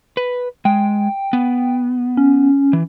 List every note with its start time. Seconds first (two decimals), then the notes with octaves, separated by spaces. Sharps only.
0.17 B4
0.65 G#3 G5
1.33 B3
2.17 C#4
2.73 E3